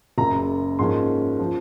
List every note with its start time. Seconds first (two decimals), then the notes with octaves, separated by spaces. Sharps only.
0.18 F#1 F#2 C#3 A#5
0.79 G#2 F3 A#3 C#4 C6
1.39 F3